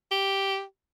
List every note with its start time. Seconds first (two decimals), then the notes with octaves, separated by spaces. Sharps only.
0.11 G4